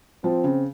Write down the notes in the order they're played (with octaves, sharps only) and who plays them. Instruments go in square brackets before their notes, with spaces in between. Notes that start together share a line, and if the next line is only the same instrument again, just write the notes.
[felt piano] F3 [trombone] C4
[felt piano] C#3